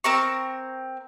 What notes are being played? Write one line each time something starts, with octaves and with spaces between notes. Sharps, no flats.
C4 A#4 C#6